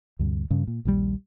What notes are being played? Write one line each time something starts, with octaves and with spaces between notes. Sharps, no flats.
D2 G2 C3
G2 C#3 G3
A#2
A#1 D#2 E3 G3